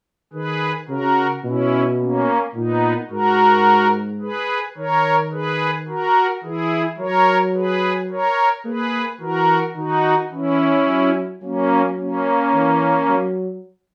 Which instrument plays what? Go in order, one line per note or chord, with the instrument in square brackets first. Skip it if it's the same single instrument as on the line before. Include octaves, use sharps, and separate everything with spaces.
[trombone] D#3 [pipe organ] G#4 B4
[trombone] C#3 [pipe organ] F#4 A#4
[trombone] B2 [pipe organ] C#4 E4
[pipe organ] A#3 C#4
[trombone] A#2 [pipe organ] B3 D#4
[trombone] G#2 [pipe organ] F#4 A#4
[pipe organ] G#4 B4
[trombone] D#3 [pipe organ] A#4 C#5
[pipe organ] G#4 B4
F#4 A#4
[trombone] E3 [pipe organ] E4 G#4
[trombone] F#3 [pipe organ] A#4 C#5
[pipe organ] G#4 B4
A#4 C#5
[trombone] A#3 [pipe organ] G#4 B4
[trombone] E3 [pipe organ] F#4 A#4
[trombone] D#3 [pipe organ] D#4 F#4
[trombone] E3 [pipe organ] C#4 E4
[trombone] F#3
[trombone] F#3 [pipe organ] A#3 C#4
[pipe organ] A#3 C#4
[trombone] E3
F#3